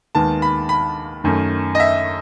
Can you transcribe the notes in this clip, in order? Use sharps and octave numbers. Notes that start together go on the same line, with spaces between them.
D#2 D#3 G#3 B3 A5
B5
B5
F#2 D#3 A3 C#4
D#5
E5